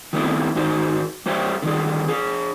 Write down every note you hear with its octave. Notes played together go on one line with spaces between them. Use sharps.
D#3 G3 A3 B3 C4 E4
G#2 D#3 D#4 F#4 C5
G3 G4 C5 C#5 E5 G5
D3 D#3 G3 G#4
D4 G#4